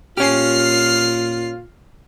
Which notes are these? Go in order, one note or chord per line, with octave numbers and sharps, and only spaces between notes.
A#2 C#4 F4 G4 F6 C7